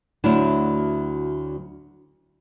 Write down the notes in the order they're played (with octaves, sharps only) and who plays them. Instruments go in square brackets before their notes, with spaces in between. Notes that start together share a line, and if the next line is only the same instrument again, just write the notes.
[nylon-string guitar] D2 F#3 D4 E4